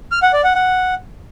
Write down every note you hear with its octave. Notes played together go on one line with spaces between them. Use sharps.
F6
F#5
D5
F#5
F#5